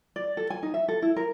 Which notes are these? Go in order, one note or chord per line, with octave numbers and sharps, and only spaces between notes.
D5
A4
G#5
D#4
E5
A4
E4
A#4